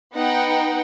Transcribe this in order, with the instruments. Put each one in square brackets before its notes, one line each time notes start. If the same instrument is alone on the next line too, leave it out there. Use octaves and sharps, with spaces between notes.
[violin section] B3 D#4 F#5 G5